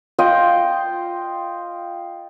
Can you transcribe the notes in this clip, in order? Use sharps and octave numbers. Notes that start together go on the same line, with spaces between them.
F4 D#5 G5